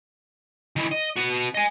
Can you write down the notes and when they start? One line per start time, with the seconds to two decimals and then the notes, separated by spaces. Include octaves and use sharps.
0.76 D#3 E4
0.91 D#5
1.16 B3 F#4
1.55 D#5 G#5